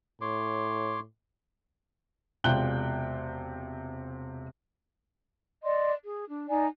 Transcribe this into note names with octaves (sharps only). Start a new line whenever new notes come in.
A2 C#5 C6 D6
E1 C3 F4 G5 F#6 G7
D5 D#5 C6
G#4
D4
D#4 D5 G#5